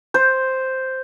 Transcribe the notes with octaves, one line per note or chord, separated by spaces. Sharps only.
C5